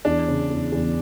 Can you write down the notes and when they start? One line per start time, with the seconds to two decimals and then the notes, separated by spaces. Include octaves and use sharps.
0.05 E2 D4
0.28 C#3
0.50 E2
0.72 E2